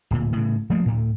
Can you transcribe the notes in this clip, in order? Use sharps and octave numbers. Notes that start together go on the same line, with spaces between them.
D1 A#2
A2 C#3
F3 A3 A#3
D2 A2